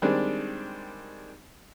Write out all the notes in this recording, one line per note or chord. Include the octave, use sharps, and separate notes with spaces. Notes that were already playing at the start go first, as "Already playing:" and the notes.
D#3 G3 G#3 C4 D4